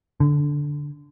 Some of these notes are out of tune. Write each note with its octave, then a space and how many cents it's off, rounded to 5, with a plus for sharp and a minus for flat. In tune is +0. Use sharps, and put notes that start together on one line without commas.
D3 -10